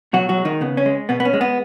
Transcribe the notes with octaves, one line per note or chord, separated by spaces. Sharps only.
B2 F#3 F#4
F#3 F#4
G#3
D#3 D#4
C#3 B3
C#4
G#3
B2 B3
B3
C#4
G#3
B3